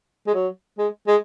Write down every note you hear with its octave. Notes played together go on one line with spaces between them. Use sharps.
G#3
F#3
G#3
G#3